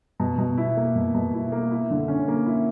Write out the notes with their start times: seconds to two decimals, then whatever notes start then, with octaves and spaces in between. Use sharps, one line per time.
0.20 B2
0.38 B2
0.57 E4
0.77 A#3
0.95 B2
1.14 B2
1.34 E4
1.52 A#3
1.71 E4
1.90 D3
2.08 C#4
2.28 A#3
2.46 E4